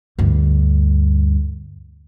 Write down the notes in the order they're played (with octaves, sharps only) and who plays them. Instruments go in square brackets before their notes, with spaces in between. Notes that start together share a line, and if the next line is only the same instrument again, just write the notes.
[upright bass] D2 G2